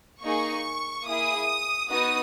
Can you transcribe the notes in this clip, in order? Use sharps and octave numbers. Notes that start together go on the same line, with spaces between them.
A#3 D#4 G#4 C#6
A#3 E4 G#4 D#6
B3 D#4 F#4 D#6